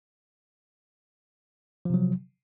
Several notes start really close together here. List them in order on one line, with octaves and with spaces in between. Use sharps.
F3 C3 F#3